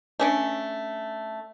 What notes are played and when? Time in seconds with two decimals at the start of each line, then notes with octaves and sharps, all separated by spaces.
0.20 A3 C#4 D4